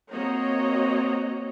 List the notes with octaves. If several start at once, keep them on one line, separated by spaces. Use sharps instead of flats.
A#3 C4 F#4 C#5 D#5 A#5